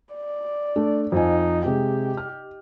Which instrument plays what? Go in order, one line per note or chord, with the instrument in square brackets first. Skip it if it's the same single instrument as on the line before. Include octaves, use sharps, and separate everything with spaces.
[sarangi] D5
[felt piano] A3 D4
[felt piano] F2 F3 G#5 [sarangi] D#4
[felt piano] C3 G#3 [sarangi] G4
[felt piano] F6